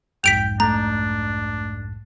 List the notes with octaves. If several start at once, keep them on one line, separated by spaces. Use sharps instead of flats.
B1 F2 G#2 G5 B6 D7 F7
A3 D4 A#5